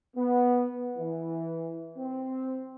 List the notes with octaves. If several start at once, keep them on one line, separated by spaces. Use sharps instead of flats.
B3
E3
C4